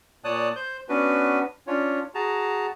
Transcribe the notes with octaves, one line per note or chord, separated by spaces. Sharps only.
A#2 C#5 D5 A5 D#6 F#6
C5 G6
B3 C#4 D4 F#4 B4
C#4 D4 F4 C#5
F#4 G#4 A5 A#5